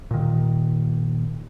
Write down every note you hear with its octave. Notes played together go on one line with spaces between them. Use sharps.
A#2 D#3